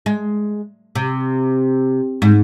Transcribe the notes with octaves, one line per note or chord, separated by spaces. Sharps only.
G#3
C3
G#2